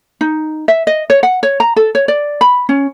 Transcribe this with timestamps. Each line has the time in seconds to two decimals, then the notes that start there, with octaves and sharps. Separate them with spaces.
0.21 D#4
0.68 E5
0.87 D#5
1.10 C#5
1.23 F#5
1.43 C#5
1.60 A#5
1.76 A4
1.95 C#5
2.08 D5
2.41 B5
2.69 C#4